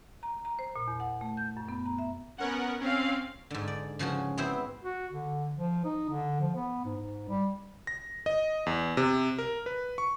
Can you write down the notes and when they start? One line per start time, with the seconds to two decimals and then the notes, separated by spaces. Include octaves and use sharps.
0.23 A#5
0.45 A#5
0.59 C5
0.76 A#2
0.88 E2
1.00 F#5
1.21 A3
1.37 G6
1.57 F#2
1.69 B3
1.85 A#5
1.99 E5
2.38 B3 C#4 A#4 F#5
2.81 C4 C#4 F5
3.50 G#2 D3
3.68 D5
3.99 C#3 F3 C#4 F#4
4.37 B3 C4 E4 F#4 C5
4.84 F#4
5.12 D3
5.54 F3
5.85 D#4
6.09 D3
6.40 F3
6.55 B3
6.85 G#2
6.98 G#2
7.29 G3
7.87 A#6
8.26 D#5
8.66 E2
8.97 C3
9.39 A#4
9.66 B4
9.98 C#6